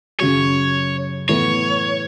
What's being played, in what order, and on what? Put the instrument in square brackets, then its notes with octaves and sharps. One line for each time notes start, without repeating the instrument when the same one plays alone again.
[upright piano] F#2 C#3 F#3 [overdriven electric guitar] C#5
[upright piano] A2 E3 B3 E4 A4 [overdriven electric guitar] C#5